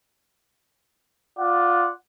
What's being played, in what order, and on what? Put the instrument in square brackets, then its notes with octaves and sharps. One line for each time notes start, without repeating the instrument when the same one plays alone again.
[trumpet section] F4 D5 F#5